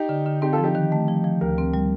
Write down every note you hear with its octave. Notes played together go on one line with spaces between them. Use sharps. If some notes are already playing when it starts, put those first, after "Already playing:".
Already playing: D#4 G4
D3
D3
C4 D#4 G4
F4 A4
F3
D#4 G4
D#3
A3
F3
F3
D2 G4 A#4
C4
G3